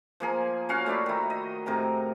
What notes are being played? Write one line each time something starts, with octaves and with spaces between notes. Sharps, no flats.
F3 A#3 G#4
C#4 F#4 C#5 F5
A3 E4 D5 B5
D#3 E4
D#5
A2 C3 A#4 A#5